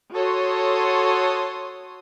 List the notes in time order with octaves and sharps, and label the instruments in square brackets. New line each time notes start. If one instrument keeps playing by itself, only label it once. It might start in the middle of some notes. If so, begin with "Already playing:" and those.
[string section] F#4 A4 C#5 C6 D#6